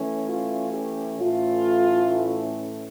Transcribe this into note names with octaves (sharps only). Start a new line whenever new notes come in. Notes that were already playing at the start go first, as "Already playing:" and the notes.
Already playing: E3 A3 C#4
F4
G4
A2 E3 A3 C#4 F4